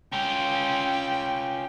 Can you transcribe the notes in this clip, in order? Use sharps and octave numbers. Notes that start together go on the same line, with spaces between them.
C#4 F4 G5